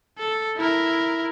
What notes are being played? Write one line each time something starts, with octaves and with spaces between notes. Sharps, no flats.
A4
E4 A#4